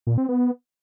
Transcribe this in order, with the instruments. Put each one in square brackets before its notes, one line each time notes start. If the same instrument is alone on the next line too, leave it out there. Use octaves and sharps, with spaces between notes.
[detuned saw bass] A#2
C4
B3